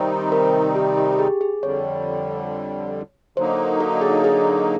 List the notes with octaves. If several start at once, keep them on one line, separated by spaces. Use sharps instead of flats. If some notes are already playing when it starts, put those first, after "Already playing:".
Already playing: C3 D#3 G3 C4 D#4
A#4
G4
G4
G4
G#4
G#4
F2 D3 G3 C#5
D3 F#3 A#3 D#4 C5
A4
G#4
G#4